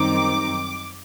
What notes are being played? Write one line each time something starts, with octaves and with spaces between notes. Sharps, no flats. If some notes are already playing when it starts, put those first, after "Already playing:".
Already playing: F#2 D#3 G3 C4 D#4 D6